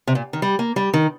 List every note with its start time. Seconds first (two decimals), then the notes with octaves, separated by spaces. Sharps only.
0.07 C3
0.15 A#2
0.33 D#3
0.42 G3
0.59 A#3
0.76 G3
0.94 D#3